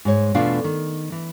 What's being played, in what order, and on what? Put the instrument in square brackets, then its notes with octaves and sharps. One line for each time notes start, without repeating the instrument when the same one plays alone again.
[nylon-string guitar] G#2 G#3 C#5
E2 B2 A3 D4 F4 F5
D#3
E3